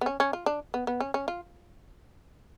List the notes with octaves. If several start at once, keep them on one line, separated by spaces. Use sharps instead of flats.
B3
C#4
C#4
F4
D4
B3
B3
C#4
C#4
F4